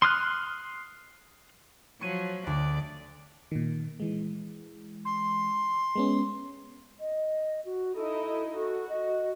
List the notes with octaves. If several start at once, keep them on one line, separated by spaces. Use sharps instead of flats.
C6 D#6 F6 F#6
F3 F#3 C#6 G#6 D#7
D2 D5
A#2 D#3
E3 G#3
C6
G#3 B3 C#4
D#5
F#4
D#4 E4 A4 D#5
F#4 A4
D#5